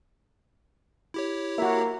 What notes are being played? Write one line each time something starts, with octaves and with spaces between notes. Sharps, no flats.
E4 G4 C#5
A#3 F#4 E5